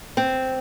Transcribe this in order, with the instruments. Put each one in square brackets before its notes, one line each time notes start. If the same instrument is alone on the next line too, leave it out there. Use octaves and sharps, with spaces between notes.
[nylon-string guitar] C4